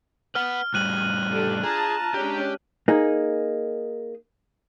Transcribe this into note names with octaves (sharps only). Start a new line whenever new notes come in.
B4 F#5 F6
A2 G3 F#6 D#7 F#7
D4 G4 A4
F4 G#4 A5 A#5
G#3 C#4 D4 G4
A#3 D#4 G#4